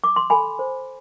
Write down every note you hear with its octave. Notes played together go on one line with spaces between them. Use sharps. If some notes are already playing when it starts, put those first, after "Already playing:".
D6
C6
A4 G#5 B5
C5